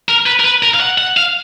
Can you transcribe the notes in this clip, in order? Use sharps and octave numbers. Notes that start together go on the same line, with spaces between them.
A#4
B4
A#4
B4
A#4
F5
F#5
F#5
F5